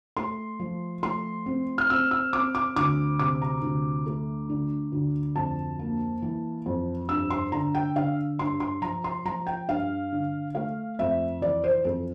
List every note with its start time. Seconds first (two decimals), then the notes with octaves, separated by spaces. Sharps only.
0.17 A3 C6
0.60 F3
1.03 A3 C6
1.46 C4
1.78 F6
1.90 C4 E6
2.11 E6
2.33 C4 D6
2.55 D6
2.76 D2 D6
3.19 C3 D6
3.42 A#5
3.62 D2
4.06 A3
4.49 D3
4.92 D2
5.36 F2 A5
5.79 A#3
6.22 E3
6.66 F2
7.09 G2 E6
7.30 C6
7.52 D3 A#5
7.75 G5
7.96 D3 F5
8.39 G2 C6
8.60 C6
8.82 F3 A#5
9.04 C6
9.25 F3 A#5
9.47 G5
9.68 G2 F5
10.12 D3
10.55 A3 F5
10.99 F2 E5
11.41 E3 D5
11.64 C5
11.85 F2 A4